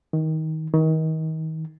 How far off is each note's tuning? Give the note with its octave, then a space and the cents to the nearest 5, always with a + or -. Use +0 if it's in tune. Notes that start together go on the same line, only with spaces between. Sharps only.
D#3 +25
D#3 +35